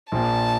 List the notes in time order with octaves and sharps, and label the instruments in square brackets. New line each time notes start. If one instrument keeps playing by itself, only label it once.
[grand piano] A#1 A#2 F3 A#3 [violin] A5